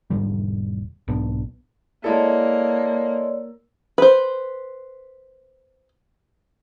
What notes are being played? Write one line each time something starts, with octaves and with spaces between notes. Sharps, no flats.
E1 G#2 D3 G3
B1 G#2 B3 D4
G#3 A#3 E4 A4 C#5 D5
B4 C5